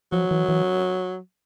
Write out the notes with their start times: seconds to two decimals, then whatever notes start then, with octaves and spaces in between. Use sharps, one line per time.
0.12 F3 F#3
0.31 E3
0.49 E3